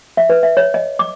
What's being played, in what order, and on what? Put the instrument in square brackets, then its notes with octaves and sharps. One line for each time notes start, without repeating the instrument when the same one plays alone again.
[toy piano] E5
B4
E5
C#5
D#5
D6